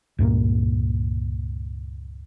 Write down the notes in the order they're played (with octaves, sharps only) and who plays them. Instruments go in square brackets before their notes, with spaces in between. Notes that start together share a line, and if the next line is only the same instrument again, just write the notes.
[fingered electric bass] C#2 G2 A#2 A#3